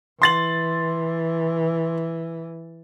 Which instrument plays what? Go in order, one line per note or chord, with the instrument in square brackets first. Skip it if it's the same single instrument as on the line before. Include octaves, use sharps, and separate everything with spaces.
[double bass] E3 [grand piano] C6 A6 F#7